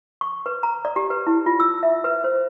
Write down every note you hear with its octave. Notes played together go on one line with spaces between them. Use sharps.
C#6
B4
A#5
D5
G4
B4
E4
F4
E6
E5
B4
C5